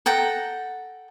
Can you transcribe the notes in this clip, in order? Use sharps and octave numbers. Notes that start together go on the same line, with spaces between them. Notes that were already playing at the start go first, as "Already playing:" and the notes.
A4 F#5 G5 A#5